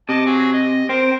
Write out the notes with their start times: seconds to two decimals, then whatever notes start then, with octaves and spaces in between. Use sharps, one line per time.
0.09 C3 D#5 A5
0.26 F#3 G#4
0.53 D#5
0.89 C4 A#4 C5